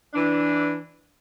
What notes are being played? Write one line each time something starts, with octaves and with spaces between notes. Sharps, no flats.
E3 D4